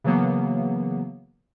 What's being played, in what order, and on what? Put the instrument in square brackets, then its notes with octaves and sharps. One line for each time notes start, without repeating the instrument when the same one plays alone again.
[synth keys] C#3 E3 F#3 A#3 B3